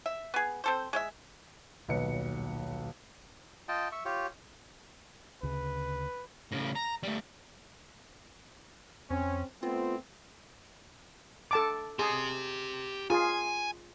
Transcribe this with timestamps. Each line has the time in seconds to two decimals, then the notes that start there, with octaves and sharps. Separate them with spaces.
0.06 E5
0.34 B3 G#4
0.64 C4 A4 C5
0.93 G#3 C5 E5
1.88 D#1 B1 F#3 B4 D#5 C#7
3.68 F4 D#5 G5 A5
3.92 E5 C#6
4.05 F4 G4 C#5
5.43 D2 C#3 B4
6.52 A2 C#3
6.76 A#5
7.03 G3 A3
9.10 F2 C4 C#4
9.63 A3 B3 C4 F4
11.51 A4 A5 D6
11.99 G4 G#4 C6
13.10 F4 G#4 G#5